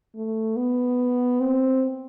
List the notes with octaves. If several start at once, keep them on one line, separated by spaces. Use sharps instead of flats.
A3
B3
C4